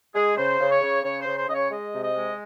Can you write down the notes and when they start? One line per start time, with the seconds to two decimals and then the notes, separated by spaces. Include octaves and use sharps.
0.15 G#3 G#4
0.36 C#3 C5
0.60 C#3
0.70 C#5
0.81 C#3
1.03 C#3 C#5
1.20 C5
1.26 C#3
1.37 C5
1.48 C#3 D#5
1.54 C#5
1.71 G#3 D#5
1.93 C3
2.04 D#5
2.15 G#3